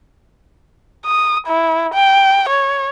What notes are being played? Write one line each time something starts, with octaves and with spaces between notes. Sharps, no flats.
D#6
E4
G5
C#5